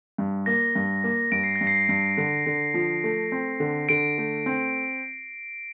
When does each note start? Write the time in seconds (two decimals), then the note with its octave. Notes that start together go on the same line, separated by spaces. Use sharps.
0.18 G2
0.46 A#3 A#6
0.75 G2
1.04 A#3
1.32 G2 D7
1.44 C7
1.56 A#6
1.61 G2
1.67 C7
1.89 G2
2.17 D3
2.46 D3
2.74 F3
3.04 A3
3.32 C4
3.60 D3
3.89 D3 D7
4.18 A3
4.46 C4